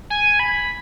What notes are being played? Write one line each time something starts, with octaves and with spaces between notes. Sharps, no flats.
G#5
B5